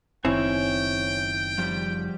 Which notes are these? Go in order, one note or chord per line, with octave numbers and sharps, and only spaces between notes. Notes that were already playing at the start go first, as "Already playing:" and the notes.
F#1 D#3 C4 E4 C#5 G5 G#5
F3 G3